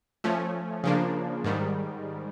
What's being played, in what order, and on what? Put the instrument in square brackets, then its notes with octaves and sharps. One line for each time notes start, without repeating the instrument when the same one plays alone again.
[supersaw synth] F3 A3 C#4
C#3 F3 A#3 D4
G#2 D#3 G3